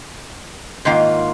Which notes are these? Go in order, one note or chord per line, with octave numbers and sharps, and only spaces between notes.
G#2 D#3 A#3 F4